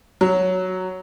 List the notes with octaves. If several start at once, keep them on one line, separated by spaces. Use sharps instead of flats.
F#3